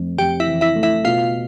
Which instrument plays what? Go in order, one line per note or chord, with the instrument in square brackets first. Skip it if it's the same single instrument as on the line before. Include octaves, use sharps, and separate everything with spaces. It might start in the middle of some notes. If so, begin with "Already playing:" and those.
Already playing: [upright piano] F2 A3
[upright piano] F2 [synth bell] G4 G5
[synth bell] E4 E5
[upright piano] E3
[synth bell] E4 E5
[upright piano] A3
[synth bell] E4 E5
[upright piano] B2 [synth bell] F4 F5